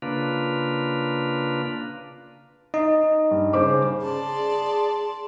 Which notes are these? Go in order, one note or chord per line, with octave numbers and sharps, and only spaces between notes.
C#3 A#3 D4 F4 B4
D#4 D#5
G2
C#3 C5 D6
G#4 D5 A5 C6